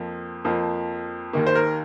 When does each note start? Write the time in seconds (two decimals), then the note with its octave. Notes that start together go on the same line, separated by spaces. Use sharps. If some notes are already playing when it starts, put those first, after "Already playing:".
Already playing: F2 F3 A#3
0.44 F2 F3 A#3
1.33 D#2 D#3 A#3
1.47 C5
1.55 A#4